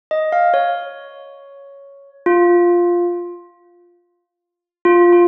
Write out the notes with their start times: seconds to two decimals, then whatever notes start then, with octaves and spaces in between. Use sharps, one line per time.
0.11 D#5
0.32 F5
0.54 C#5
2.26 F4
4.85 F4
5.13 F4